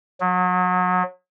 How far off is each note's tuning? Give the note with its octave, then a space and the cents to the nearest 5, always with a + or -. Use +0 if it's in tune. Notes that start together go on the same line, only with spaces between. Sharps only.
F#3 -30